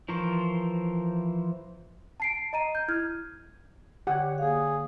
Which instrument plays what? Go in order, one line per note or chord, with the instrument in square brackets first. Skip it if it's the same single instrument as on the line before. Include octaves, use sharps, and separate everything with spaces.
[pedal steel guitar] E3 F3 A#4 C5 C#6
[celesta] A5 C7 D7
D#5 A#5 D#7
G6
E4 F6 G#6
[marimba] D3 C#5 G#6 [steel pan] G4 F#5
[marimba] A#3 F5 [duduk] G#4